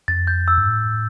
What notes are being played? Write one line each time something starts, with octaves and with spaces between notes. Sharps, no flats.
F2 A6
G6
E6
G2
A2